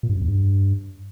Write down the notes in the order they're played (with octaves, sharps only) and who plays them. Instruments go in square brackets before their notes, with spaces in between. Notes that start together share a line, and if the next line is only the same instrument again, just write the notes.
[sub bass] A#2
G2
F#2
E2
G2